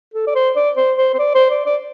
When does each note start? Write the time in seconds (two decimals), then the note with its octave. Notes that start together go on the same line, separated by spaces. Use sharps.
0.14 A4
0.27 D5
0.35 C5
0.56 D5
0.77 C5
0.98 C5
1.14 C5
1.19 D5
1.35 C5
1.50 D5
1.66 D5